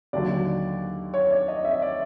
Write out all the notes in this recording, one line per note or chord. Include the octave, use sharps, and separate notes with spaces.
D#2 D3 F#3 D5
C#5
D5
D#5
E5
D5